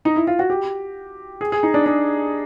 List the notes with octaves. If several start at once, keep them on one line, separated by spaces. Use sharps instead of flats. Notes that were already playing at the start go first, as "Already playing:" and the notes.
D#4
E4
F4
F#4
G4
G#4
G#4
D#4
D4
D4